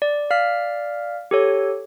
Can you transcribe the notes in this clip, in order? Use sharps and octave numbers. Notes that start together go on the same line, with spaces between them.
D5
D5 F5 F6 B6
G4 A4 C#5